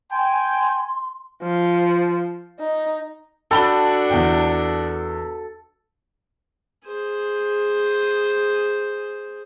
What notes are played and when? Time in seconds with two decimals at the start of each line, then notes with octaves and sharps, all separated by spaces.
0.11 G5 G#5 C6
1.43 F3
2.59 D#4
3.51 D4 F#4 A4 G5 B5 G7
4.10 E2 G5
6.86 G#4 C5